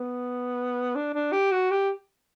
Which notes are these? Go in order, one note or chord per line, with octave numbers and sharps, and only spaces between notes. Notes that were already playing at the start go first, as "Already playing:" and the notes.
Already playing: B3
D4
D4
G4
F#4
G4